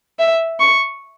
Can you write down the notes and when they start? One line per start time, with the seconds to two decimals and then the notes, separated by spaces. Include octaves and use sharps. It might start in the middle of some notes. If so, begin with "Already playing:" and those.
0.19 E5
0.60 C#6